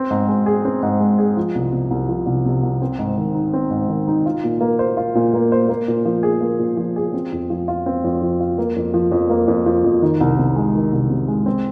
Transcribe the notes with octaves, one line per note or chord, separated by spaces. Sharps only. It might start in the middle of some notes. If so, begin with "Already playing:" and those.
Already playing: C4
G#2
G#3
G#4
C4
G#2
G#3
G#4
F3
C2
C3
C2
F3
C2
C3
C2
C4
G#2
D#3
D#4
C4
G#2
D#3
D#4
F4
A#2
A#3
C5
F4
A#2
A#3
C5
A#3
A#2
F3
G#4
A#3
A#2
F3
G#4
C4
F2
F3
F4
C4
F2
F3
F4
A#3
F2
F3
F2
A#3
F2
F3
F2
D#3
C2
C3
G#3
D#3
C2
C3
G#3
C4